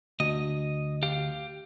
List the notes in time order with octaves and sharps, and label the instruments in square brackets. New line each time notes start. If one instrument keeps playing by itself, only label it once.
[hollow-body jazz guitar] D2 [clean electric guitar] D#5
[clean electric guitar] G4 F5